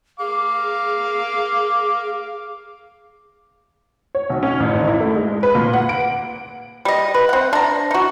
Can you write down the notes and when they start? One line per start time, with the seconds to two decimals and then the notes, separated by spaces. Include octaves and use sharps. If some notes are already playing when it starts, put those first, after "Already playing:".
0.20 G#4 F5 D6
4.15 C#5
4.30 B1
4.43 C#4
4.60 A1
4.74 G#1
4.88 E4
5.00 A3
5.16 G#3
5.43 B4
5.55 A#2
5.73 F#5
5.89 D7
6.85 G3 D#5
7.14 B4
7.29 C4 F#5
7.53 D4 A#5
7.91 D#4 F#4